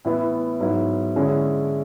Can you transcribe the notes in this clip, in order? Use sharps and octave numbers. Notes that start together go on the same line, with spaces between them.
A2 E3 B3 E4
G#2 F#3 B3 E4
D3 G#3 C#4 E4